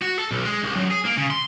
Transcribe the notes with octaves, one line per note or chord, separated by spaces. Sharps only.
F#4
A4
B1
G#3
C2
F#2
G#4
A#3
C#3
C6